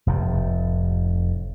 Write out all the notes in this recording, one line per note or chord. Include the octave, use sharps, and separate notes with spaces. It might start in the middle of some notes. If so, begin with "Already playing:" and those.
F1 A2 C3